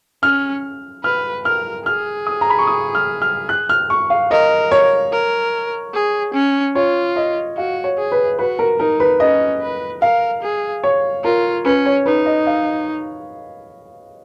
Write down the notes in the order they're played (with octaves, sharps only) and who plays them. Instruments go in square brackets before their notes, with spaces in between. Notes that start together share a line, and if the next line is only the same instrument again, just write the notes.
[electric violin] C#4 [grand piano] F6
[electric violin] B4 [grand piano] F6
[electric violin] A#4 [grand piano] F6
[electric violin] G#4 [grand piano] F6
[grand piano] D#6
A#5
B5
C#6
D#6
F6
F6
F#6
F6
C#6
F5
[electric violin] A#4 [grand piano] D#5
[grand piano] C#5
[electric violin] A#4
G#4
C#4
[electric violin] F4 [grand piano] C#5
[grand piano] D#5
[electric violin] F#4 [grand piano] F5
[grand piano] C#5
[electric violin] G#4
[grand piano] B4
[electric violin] F#4 [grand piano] B4
[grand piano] A#4
[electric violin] D#4 [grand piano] A#4
[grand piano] B4
[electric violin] C#4 [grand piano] D#5
[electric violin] B4
[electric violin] A#4 [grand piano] F5
[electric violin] G#4
[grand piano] C#5
[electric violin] F4 [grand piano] A#4
[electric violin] C#4 [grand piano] B4
[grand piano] C#5
[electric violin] D#4 [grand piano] B4
[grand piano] D#5
F5